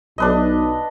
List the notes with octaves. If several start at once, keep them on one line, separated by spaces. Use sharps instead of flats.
B1 D4 B4 D#5